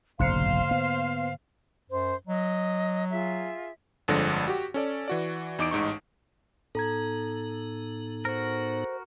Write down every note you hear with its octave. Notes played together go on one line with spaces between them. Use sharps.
F#1 B1 F2 G#2 D3 A#3 C5 F5
B3
F#2 C5
F#3 D#5
F4 G#4 E5
G1 F2 D3 F3 G#3 A#6
F#4 G4
C#4 A4 D5
E3 F#4 D5
E2 D#4 D6 D#6 D7
A1 G#2 D#4 C#6
A2 B3 D#4 A4 A#5 G#6
F#4 A#4 C5